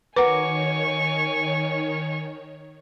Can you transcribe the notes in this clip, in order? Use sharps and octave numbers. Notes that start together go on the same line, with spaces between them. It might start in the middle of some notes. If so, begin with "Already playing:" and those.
D#3 F#4 A#4 B4 C#5 G#5 C#6 D6